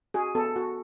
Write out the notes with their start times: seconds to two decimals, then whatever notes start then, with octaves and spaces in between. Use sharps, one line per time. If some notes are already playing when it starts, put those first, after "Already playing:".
0.14 F#4 G#4
0.35 B3 A4
0.56 F#4